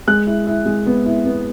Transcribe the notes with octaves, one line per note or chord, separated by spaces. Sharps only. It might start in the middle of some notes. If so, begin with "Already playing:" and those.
G#3 F#6
E4
E4
G#3
B3
E4
B3